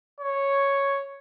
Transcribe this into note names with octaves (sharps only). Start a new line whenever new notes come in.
C#5